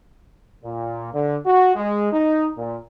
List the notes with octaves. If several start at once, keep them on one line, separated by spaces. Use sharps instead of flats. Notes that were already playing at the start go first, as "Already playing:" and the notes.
A#2
D3
F#4
G#3
D#4
A#2